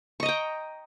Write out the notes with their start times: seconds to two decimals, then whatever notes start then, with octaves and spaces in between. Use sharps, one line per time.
0.20 C#6
0.23 D#5
0.26 A#5
0.28 G5